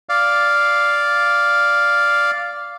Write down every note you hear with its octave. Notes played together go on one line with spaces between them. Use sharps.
D5 F5